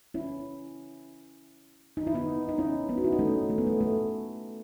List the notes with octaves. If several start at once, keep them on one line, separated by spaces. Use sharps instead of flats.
C#4 E4
D#4
E4
B3 D#4
D#4
C#4 E4
B3 D#4
F#4
E4
D#4
A3 C#4
A3
B3
A3
A3